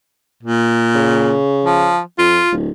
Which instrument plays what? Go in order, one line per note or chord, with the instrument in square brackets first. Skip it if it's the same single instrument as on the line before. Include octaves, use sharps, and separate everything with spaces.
[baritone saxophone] A#2
[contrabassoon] C#3
[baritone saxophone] F3
[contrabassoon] F2 [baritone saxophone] F4
[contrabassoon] D1